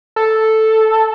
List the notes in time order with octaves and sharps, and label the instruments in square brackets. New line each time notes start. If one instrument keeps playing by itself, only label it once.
[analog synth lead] A4